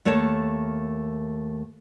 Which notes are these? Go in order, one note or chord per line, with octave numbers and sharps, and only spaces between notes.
D#2 A3 A#4 C#5 A5